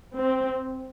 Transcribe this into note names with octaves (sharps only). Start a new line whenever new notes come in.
C4